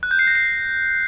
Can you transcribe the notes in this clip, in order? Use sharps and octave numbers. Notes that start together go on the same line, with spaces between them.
F#6
G6
C7
A#6
C7